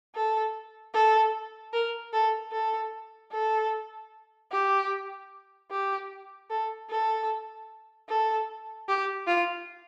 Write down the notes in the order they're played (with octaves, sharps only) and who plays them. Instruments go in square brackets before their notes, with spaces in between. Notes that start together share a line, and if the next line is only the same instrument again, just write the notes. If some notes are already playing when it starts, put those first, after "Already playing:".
[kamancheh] A4
A4
A#4
A4
A4
A4
G4
G4
A4
A4
A4
G4
F4